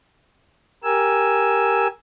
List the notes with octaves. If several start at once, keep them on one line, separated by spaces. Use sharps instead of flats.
G4 A#4 G#5 E6